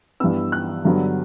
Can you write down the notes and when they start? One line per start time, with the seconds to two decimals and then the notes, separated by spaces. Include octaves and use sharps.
0.20 G2 E3 B3 E6
0.52 F#6
0.85 G2 D3 F#3 B3